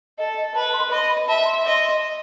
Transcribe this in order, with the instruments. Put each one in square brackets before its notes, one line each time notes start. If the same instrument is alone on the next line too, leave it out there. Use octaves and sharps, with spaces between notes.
[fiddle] A4 [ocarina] D#5
[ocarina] D#5
[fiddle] B4 [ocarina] A5
[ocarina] C6
[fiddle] D#5 [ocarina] B5
[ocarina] B5
[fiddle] E5 [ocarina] A5
[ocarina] C6
[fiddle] D#5